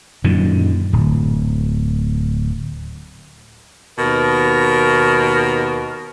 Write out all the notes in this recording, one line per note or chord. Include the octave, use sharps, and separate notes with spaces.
F#2 A#2 D3 D#3
D1
D#2 B2 A#4